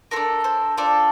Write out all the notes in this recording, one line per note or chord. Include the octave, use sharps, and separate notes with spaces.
D4 F4 A4 A#4
C5
D4 F4 A4 D5